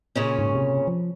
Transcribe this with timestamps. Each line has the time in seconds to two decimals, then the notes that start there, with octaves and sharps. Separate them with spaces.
0.15 A#2 C#3 C#4
0.39 G#2
0.55 C3
0.87 F3